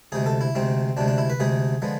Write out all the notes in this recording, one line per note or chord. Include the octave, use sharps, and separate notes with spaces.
D2 C3 G#3 G#4
A4
E4
D2 C3 G#3 C4
D2 C3 G#3 D4
D4
E4
B4
D2 C3 G#3 G#4
D3 F3 G#3 B3